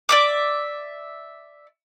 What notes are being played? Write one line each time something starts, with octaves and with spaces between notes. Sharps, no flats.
D5 E5 D6